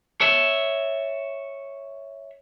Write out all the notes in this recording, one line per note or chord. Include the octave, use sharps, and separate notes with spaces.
C#5 E5